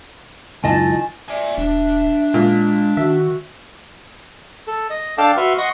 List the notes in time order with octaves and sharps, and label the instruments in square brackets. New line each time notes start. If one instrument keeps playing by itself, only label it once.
[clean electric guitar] C#2 F#2 D#5 [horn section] D#3 A5 [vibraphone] E4 F4 [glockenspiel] G#5
[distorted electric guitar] D5 G#5 [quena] E5
[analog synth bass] E1 [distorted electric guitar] D4
[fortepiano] A#2 [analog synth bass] G#3
[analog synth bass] D#3 [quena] F#4 [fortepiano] E5
[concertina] A4
D#5
D4 A4 F5 G5 A5 D6
F#4 B4 E5 C6 F6
D#5 F#5 C6 C#6 D#6